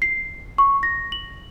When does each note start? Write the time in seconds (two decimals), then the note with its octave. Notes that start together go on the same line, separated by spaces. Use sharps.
0.02 C7
0.58 C#6
0.83 A#6
1.12 F#7